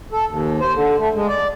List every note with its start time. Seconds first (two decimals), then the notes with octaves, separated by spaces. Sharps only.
0.12 A4
0.28 D#2
0.60 C5
0.74 D3
0.98 A3
1.14 G#3
1.28 D5